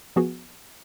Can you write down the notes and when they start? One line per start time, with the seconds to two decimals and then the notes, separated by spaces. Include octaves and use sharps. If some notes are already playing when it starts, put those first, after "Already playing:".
0.16 F3 B3 F#4 G#4